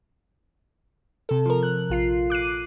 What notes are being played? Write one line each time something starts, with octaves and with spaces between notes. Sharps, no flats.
C3 A4
F3 A#4
F#6
A#1 F4 C7
D6 F#6 C7 D#7